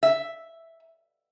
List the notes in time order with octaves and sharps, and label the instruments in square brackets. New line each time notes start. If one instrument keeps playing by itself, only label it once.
[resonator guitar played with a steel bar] E5